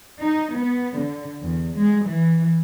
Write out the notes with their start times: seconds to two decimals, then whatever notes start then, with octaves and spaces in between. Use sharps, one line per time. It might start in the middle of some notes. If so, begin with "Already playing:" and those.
0.22 D#4
0.58 B3
1.00 D3
1.43 E2
1.77 G#3
2.08 E3